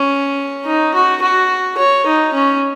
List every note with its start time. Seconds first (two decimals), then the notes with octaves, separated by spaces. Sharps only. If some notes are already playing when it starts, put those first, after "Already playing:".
Already playing: C#4
0.66 D#4
0.94 F#4
1.22 F#4
1.78 C#5
2.06 D#4
2.34 C#4